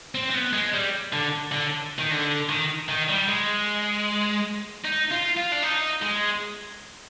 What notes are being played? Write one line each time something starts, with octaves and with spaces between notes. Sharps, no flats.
C4
C4
B3
G#3
G3
D3
D3
D#3
D3
D#3
D#3
G3
G#3
D#4
F4
F4
D4
D#4
G#3